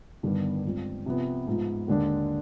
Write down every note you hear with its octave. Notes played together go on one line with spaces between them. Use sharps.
G1 G2 D#3 G3 B3
G2 F3 G#3 C4
C3 F3 B3
G#2 F3 B3
D#2 D3 G#3 D4